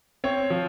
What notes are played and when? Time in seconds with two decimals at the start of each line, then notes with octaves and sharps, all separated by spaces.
0.24 C4 C#5
0.50 F3